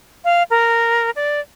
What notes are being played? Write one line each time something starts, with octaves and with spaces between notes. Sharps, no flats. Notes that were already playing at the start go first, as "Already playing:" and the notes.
F5
A#4
D5